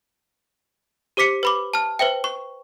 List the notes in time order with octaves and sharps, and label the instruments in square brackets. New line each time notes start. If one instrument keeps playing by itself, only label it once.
[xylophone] G4 C5 D6 B6 C#7
B4 B5 D6
A5 F6
B4 C5 E5 G5
C#6